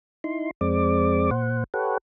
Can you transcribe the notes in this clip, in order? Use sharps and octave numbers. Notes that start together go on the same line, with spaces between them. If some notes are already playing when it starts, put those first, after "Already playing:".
D#4 E4 C6
F2 G#3 C4 D5 D6
A#2 C5 F#5
G4 A4 B4 C#5 F#5